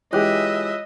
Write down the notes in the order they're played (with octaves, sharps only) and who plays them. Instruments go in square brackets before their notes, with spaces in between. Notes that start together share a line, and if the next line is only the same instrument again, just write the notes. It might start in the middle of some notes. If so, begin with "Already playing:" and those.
[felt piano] E3 G#3 G4 [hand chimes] F4 C#5 F#6 [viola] D#5 E5